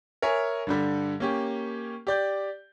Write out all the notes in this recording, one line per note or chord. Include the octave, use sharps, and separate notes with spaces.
A#4 C#5 E5 G#5
G2 D3 G3
A#3 C#4 G4
G4 D5 G6